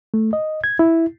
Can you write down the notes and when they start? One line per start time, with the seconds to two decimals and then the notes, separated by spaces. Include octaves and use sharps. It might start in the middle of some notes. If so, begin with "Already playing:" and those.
0.14 A3
0.33 D#5
0.64 G#6
0.79 E4